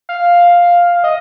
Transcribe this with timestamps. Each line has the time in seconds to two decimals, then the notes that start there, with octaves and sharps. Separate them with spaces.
0.09 F5
1.04 D#5